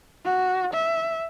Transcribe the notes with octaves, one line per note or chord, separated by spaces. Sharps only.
F#4
E5